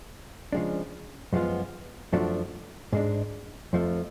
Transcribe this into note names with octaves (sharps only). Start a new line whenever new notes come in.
C#3 F3 G#3 D4
F#2 F3 G#3 B3 F4
F#2 F3 A3 D4 F#4
G#2 G#3 D4
F2 F3 A3